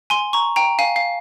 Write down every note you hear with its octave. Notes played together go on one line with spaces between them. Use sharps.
G#5 C6
A#5 C#6
G5 A#5
F5 G#5
F5